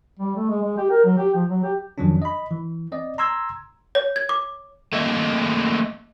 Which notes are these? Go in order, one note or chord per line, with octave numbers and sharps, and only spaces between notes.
G3
A3
G#3
G#3
G4
A#4
F#3
G4
F3
F#3
G4
F2 D#3 F3 F#3 C#4 D4
D#5 B5
E3
C4 D5 D#5
A#5 C6 E6 G#6
C#5
G#6
D6
A3 A#3 D#5 E5